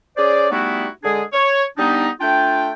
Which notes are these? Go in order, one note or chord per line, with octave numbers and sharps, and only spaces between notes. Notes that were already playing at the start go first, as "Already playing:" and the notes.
C#4 G#4 C5 D5
G3 A3 B3 D#4 E4 F#4
D3 G#3 D4 G#4
C#5
G3 B3 D4 D#4
A3 D4 F4 G5